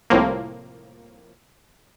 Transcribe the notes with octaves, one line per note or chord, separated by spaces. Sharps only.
C2 A2 F3 A#3